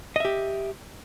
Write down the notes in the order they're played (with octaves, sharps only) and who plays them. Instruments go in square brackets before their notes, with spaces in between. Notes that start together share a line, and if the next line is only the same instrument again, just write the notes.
[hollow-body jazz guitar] D#5
E5
G4